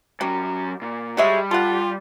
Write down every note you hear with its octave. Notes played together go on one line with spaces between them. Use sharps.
F#2 F#3 G3
A#2
G3 G#3 F#4 C#5 E5
F4 A4 F#5